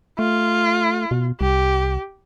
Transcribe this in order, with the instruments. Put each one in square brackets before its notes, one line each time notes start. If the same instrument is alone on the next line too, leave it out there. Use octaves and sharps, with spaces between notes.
[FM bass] A3 [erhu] F4
[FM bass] B2
[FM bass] C2 [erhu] G4